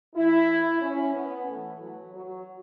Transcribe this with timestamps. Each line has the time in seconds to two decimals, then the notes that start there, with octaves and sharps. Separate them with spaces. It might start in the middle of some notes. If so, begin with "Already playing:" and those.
0.15 A2 E3 E4
0.82 C#4
1.14 B3
1.48 A2 E3 A3
1.80 F#3
2.14 F#3